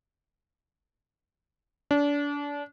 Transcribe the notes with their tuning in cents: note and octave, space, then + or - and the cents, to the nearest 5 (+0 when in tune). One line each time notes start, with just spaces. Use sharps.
D4 -30